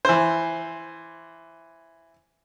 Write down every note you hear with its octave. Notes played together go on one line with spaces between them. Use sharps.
E3 C5